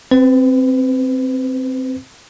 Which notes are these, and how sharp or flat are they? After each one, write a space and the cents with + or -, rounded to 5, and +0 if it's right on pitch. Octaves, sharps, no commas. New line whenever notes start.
C4 +0 B4 +35